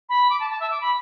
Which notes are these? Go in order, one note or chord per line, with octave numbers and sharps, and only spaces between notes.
B5
D6
A5
A5
E5
D6
B5